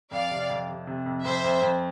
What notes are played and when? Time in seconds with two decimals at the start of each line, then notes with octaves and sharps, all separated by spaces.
0.11 F2 D5 F5
0.31 C3
0.50 F2
0.69 C3
0.87 C3
1.06 F2
1.24 F2 C5 E5
1.44 F2
1.62 F2